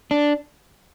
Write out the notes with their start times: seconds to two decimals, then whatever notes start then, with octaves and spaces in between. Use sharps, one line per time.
0.11 D4